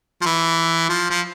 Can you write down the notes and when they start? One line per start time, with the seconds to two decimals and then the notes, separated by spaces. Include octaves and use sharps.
0.21 F3
0.26 E3
0.89 F3
1.10 F3